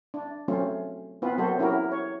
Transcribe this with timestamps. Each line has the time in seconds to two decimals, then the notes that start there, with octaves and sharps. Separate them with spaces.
0.14 D4
0.48 F#3 A3 C4 C#4 F4
1.22 B3 C4 F4 B4
1.38 F#3 A#3 C4 F#4 A4 C5
1.59 C#4 E4 F#4 G4 A#4
1.92 C#5